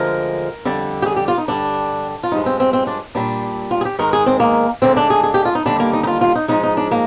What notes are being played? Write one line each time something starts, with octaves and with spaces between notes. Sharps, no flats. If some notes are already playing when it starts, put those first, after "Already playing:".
Already playing: D2 D3 F3 G#3 A#4
F2 D3 G3
G4
G#4
G4
F4
D#4
G2 D3 G3 D4
F4
G2 F3 G#3 D#4
C4
C4
C4
D4
A#2 G3 D4
F4
G#4
G4
G#2 D#3 G#3 A#4
G#4
C4
A#3
D2 D3 G#3 C4
D4
G#4
G#4
G4
F4
D#4
D#2 D3 G3 D4
A#3
D#4
D#4
F4
F4
D#4
G#2 F3 G#3 D#4
D#4
D4
A#3